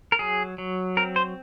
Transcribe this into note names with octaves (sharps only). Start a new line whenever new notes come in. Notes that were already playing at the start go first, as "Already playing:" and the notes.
A#4
F#3 G#4
F#3
C4 A#4
C5